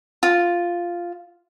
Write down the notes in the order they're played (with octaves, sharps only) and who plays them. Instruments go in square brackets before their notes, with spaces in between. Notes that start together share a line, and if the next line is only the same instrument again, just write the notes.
[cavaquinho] F4